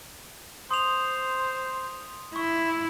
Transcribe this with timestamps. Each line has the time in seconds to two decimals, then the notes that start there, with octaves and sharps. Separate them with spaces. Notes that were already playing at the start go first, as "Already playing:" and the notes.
0.71 C5 C6 D#6 F7
2.36 E4 C#6